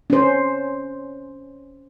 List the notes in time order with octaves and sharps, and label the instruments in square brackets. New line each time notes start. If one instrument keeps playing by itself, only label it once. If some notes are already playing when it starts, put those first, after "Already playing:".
[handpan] C#4 C5